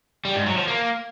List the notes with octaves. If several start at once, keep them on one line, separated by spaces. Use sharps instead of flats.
G3
G#2
F#3
F3
A#3